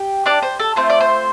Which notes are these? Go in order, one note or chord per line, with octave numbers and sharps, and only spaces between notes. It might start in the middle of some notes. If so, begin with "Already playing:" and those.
Already playing: G4
D4 D5
C5
A4
A3 C4 F4 C5
D5
C5